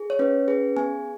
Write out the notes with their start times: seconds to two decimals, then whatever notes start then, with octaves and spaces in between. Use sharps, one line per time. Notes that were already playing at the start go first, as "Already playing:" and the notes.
Already playing: G#4
0.10 C#5
0.19 C#4 B4
0.48 G#4 B4
0.76 B3 G#5